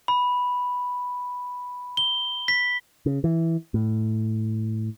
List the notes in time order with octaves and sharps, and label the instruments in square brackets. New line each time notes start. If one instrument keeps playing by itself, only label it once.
[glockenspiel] B5
G7
B6
[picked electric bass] C#3
E3
A2